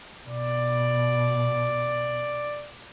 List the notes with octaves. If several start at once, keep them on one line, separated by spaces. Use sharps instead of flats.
B2 D5